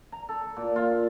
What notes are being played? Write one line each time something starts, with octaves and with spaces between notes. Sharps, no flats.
A#5
A4
A#2
F4